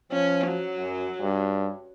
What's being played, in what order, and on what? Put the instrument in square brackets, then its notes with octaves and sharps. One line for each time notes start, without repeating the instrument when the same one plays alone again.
[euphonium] F3 [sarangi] C#4
[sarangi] F#3
[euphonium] F#2
G2